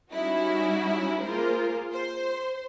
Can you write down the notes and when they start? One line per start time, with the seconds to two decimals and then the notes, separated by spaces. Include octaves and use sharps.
0.11 G3 C#4 D#4 E4 F#4
1.19 A#3 F4 G#4 A#4 C5
1.92 C5 C6